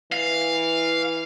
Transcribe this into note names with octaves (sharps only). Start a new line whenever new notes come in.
E3 F5